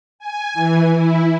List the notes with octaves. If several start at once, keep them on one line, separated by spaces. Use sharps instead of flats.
G#5
E3
E4